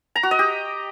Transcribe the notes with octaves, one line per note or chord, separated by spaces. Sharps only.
A#5
F#4
D#5
G4